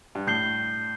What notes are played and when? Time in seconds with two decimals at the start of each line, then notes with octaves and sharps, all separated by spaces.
0.15 G2
0.27 A2 G6 C7 G7